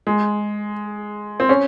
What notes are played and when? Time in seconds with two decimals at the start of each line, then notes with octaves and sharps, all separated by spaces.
0.07 G#3
1.40 C4
1.49 C#4